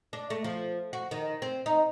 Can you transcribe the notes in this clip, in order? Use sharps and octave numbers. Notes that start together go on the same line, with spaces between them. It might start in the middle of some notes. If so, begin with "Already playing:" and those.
D4
A3
F3
F#4
D#3
C4
D#4